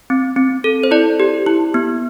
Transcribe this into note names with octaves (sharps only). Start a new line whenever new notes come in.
C4
C4
A4
C5
E4 D5
G4
E4
B3